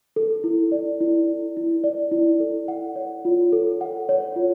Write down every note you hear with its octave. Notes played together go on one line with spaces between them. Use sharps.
A4
E4
D5
E4
A4
E4
D5
E4
A4
F#5
C#5
F4
A4
F#5
C#5
F4